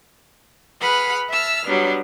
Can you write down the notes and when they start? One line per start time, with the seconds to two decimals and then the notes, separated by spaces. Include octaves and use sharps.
0.80 G#4 B4 F#5 B5 F6
1.29 E5 A5 E6 F6
1.65 F#3 G3 B3 D4